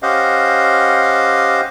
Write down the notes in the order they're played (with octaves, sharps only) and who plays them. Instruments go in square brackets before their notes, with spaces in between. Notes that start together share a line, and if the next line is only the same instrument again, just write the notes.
[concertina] C#4 G4 C5 D#5 F5 F#5